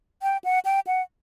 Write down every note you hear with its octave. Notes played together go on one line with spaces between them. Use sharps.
G5
F#5
G5
F#5